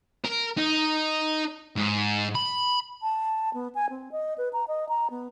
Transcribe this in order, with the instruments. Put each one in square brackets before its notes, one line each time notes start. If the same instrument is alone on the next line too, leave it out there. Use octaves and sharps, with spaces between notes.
[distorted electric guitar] A#4
D#4
G#2
B5
[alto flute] A5
B3
G#5
C4
D#5
B4
A#5
D#5
A#5
B3